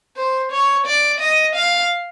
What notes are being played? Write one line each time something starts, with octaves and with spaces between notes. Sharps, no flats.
C5
C#5
D5
D#5
F5